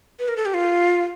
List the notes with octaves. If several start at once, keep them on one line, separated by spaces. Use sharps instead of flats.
B4
A#4
A4
G4
F4